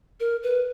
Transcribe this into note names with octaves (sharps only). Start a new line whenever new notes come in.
A#4
B4